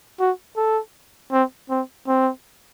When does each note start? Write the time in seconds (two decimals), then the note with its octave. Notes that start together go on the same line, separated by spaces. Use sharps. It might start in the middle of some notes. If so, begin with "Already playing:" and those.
0.20 F#4
0.57 A4
1.32 C4
1.70 C4
2.08 C4